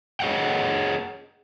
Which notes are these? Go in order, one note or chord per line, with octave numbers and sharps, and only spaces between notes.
G#4 C#5 D#5 F#5 G5